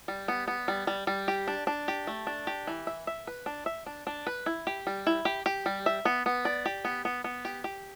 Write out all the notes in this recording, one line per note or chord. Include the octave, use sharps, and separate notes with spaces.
G3
B3
B3
G3
G3
G3
G4
D4
D4
G4
A3
D4
G4
E3
E5
E5
B4
D4
E5
D4
D4
B4
E4
G4
G3
E4
G4
G4
G3
E5
B3
B3
D5
G4
B3
B3
B3
G4
G4